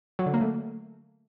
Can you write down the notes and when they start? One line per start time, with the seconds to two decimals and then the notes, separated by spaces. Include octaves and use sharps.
0.19 F#3
0.26 D3
0.34 A#3
0.41 A3